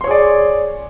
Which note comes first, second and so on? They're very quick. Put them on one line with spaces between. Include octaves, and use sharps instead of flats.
C6 C#5 G#4 D5